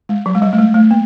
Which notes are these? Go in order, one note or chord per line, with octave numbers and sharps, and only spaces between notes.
G#3
F#3
G#3
G3
A3
G#3
A3
A#3